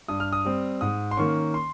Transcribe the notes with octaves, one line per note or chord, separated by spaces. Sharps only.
G2 D#6
F6
D#6
G3 C4
G#2 D#6
C6
D#3 A#3 C#4 C#6
C6